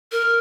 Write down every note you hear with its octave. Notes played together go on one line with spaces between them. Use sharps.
A#4